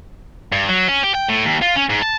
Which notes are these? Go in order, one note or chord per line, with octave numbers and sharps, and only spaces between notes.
G2
F#3
C#4
G4
G5
A2
D#2
F4
C#4
G#2
A5